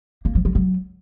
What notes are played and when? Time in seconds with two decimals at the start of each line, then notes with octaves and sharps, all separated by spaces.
0.25 A#3
0.35 F3
0.45 F#3
0.55 F#3